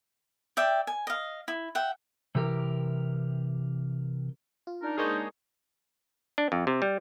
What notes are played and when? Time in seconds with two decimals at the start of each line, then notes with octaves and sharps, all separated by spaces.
0.57 D5 E5 G5
0.87 G#5
1.07 D#5 F5
1.48 E4
1.75 E5 F#5 G5
2.35 C3 E3 G4 A#4
4.67 F4
4.82 D4 D#4 A#4
4.98 G#3 A#3 G#4 C5 C#5 D#5 C#6
6.38 D4
6.52 F2
6.67 C3
6.82 G3